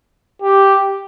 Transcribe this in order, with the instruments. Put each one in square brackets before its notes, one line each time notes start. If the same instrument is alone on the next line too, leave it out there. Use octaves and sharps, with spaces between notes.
[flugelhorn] G4